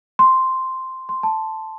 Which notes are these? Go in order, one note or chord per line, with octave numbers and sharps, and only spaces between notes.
C6
C6
A5